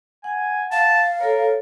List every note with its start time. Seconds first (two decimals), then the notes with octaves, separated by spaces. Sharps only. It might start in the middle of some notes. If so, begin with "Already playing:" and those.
0.24 F#5 G#5
0.72 F5 A5
1.21 A4 A#4 C#5